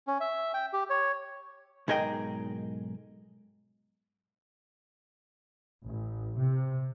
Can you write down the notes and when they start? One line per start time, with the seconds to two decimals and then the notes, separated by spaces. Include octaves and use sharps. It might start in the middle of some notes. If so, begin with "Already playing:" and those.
0.07 C#4
0.20 E5
0.54 G5
0.73 G4
0.90 C#5
1.88 B1 G#2 G#4 A#4 D#5 G5
5.84 A1
6.36 C3